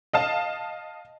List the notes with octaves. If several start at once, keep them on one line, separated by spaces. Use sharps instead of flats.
D#5 F5 A5